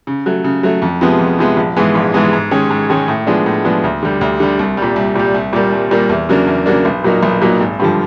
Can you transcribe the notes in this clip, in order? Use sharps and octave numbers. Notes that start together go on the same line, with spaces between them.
C#3
F#3 A3
C#3
F#3 A3
F2
C3 F3 G#3 B3
F2
C3 F3 G#3 B3
A#1
G#2 E3 G#3 B3
A#1
G#2 E3 G#3 B3
G#2
D#3 G#3 C#4
G#2
D#3 G#3 C#4
A2
F3 G#3 B3 D4
A2
F3 G#3 B3 D4
D2
D3 G3
D2
D3 G3
C2
G3
A#2
C2
A#2 G3
C2
A#2 G3 A#3
C2
A#2 G3 A#3
E2
C#3 F#3 A#3 D4
E2
C#3 F#3 A#3 D4
B1
A#2 F#3 A#3 D#4
B1
A#2 F#3 A#3 D#4
G#1
G2 D3 F3